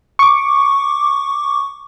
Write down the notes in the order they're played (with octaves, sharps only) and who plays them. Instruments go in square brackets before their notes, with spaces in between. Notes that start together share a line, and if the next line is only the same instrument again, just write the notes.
[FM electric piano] C#6 D6